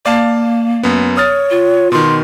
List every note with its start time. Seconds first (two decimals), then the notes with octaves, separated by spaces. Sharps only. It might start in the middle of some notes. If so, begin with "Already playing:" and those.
0.06 A#3 D5 F5 A5
0.83 F#2 B3
1.17 C#5 D#6 F6 A6
1.50 F4
1.92 B2 D#3 C6